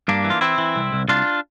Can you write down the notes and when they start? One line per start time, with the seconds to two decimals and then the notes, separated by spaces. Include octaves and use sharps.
0.08 G2 A#3 D4
0.24 E3
0.30 F4
0.41 E3 C4 E4
0.58 E3
0.76 C2
0.93 C2
1.08 C2 D4 F4